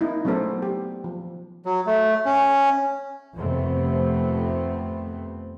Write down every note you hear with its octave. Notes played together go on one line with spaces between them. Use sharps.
A#3 C4 D#4 E4
F#3 A3 B3 C#4 A4 C5
G4
F3
F#3
A3
C#4
F2 C3 D#3 A3 B3 C4